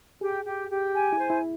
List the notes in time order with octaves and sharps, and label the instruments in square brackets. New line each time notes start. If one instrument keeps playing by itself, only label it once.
[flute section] G4 [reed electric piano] G#4
[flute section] G4
G4
G#5
[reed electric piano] E4
[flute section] C5
[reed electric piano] E4